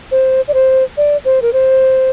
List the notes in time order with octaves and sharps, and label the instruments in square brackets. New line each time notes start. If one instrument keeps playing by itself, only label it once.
[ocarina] C5
D5
C5
D5
C5
A#4
C5